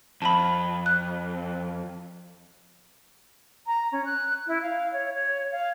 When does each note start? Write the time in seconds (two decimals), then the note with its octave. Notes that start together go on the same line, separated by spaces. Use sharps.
0.22 F2 A5 B5
0.86 F#6
3.66 A#5
3.92 C#4
4.05 F#6
4.47 E4
4.62 F5
4.93 C#5
5.13 C#5
5.52 F5